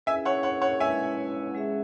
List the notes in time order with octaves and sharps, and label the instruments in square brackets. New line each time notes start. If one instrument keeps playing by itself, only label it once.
[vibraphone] C#4 E4 G#4 B4 [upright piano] E5 G#5
[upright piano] C#5 F#5
C#5 F#5
C#5 F#5
[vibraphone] G#3 C#4 E4 B4 [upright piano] E5 G#5
[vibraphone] G#3 C#4 G#4 E5